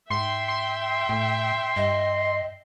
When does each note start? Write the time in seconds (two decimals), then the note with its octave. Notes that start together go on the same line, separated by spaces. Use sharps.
0.10 G#2 E5 G5 C6
0.48 C6
1.09 A2
1.76 G2 D#5